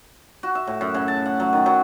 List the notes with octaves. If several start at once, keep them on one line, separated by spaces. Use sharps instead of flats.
F#4
E5
A2
F#2
C#3
A5
F#5
F#3
D#3
F#3